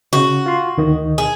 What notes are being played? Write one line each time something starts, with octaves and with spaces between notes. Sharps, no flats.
C#3 F#4
F4 C6
D2 D#3 D#5
G#4